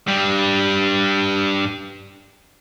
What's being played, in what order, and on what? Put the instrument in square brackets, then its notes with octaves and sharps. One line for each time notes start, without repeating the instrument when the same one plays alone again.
[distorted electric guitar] G2 G3